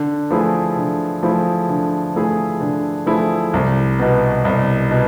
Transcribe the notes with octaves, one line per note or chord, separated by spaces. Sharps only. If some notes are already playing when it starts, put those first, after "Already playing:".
Already playing: D3
F3 A3 E4 G#4
D3
F3 A3 E4 G#4
D3
F3 A3 E4 G#4
D3
F3 A3 E4 G#4
C2
B2 B3
C2
B2